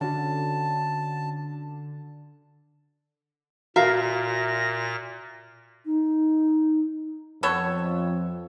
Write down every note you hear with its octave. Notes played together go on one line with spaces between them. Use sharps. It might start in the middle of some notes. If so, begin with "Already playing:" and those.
D3 C#4 F#4 A5
A#2 F#4 A#4 E5 F5 A#6
D#4
F2 B3 A4 C#5